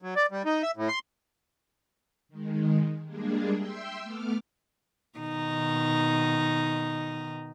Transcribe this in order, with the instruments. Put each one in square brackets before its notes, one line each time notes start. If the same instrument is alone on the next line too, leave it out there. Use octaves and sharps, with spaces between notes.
[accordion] F#3
D5
G3
D#4
E5
A2
C6
[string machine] D#3 G#3
G3 G#3 A#3 D4 G#4
E5 G5 C6 E6
A3 B3 D6 F6
[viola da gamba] B2 D#3 D#4